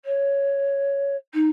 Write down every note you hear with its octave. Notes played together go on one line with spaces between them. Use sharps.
C#5
D#4